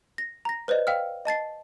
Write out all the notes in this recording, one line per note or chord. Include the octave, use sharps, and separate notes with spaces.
A#6
A#5 A#6
B4 C5 D5 D#5
F5 G5 E6 F6
D#5 A5 A6 C7